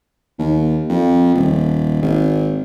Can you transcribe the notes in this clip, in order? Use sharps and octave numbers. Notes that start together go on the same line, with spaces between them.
D#2
F2
D#1
G#1